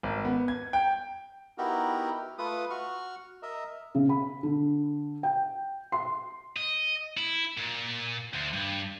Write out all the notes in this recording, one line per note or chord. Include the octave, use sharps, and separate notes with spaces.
G#1
B3
G#6
G5
B3 D#4 E4 F#4 G4 A#4
A3 F4 B4 D#6
F#4 C#6 F6
A#4 D#5 E5
C#3
B5
D3
G5
C6
D#5
E4
A#2
D2
G2